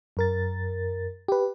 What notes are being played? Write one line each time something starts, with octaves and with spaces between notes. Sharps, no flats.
F#2 A#4 A6
G4 B4